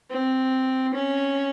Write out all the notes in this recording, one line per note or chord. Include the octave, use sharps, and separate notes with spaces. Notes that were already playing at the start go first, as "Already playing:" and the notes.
C4
C#4